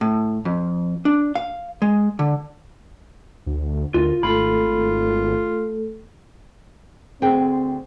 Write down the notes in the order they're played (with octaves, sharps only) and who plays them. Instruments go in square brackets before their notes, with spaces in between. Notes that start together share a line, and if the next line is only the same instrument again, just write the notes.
[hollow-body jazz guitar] A2
F2
D4
F5
G#3
D3
[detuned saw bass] D2
[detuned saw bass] D2 [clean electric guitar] F4 [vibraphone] A#4
[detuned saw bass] G#1 [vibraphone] A3 A4 [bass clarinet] F4 [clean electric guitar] B5
[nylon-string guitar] D2 G#4 G5 [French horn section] C4